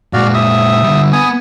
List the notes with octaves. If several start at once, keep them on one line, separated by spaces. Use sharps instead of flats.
A#2 G#3 F#4 D5 F5
E5 D#6
D3 G3
B3 G#5 D#6